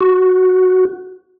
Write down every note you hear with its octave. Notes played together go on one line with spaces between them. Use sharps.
F#4